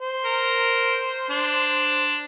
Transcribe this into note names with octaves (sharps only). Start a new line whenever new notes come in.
C5
A#4
D4